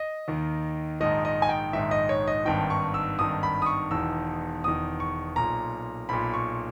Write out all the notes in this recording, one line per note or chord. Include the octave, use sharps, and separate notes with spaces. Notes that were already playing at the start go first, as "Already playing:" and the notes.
Already playing: D#5
D#2 D#3
A#1 G#2 D#3 D#5
D#5
G#5
G5
A#1 G#2 D#3 E5
D#5
C#5
D#5
G#1 G2 D#3 G5
C#6
E6
G#1 G2 D#3 D#6
B5
D#6
C#6
E1 E2 D#3 E6
E1 E2 D#3 D#6
C#6
B1 A#2 A#5
B1 A#2 B5
C#6